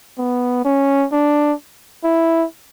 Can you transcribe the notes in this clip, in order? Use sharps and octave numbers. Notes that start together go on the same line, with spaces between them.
B3
C#4
D4
E4